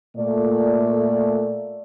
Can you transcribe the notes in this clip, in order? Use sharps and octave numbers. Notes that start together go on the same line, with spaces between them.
A#2 A3 D5